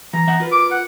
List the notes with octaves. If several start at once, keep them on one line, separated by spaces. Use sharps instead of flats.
E3 A#5
E3 E5 F#5
F4 A#4 B4
D6
F#5